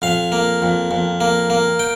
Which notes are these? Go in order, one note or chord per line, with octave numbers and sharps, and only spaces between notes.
F2 F5
A#3
F2
F2
A#3
A#3
G5